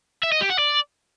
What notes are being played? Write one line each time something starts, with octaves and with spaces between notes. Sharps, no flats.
E5
D#5
G4
F#5
D5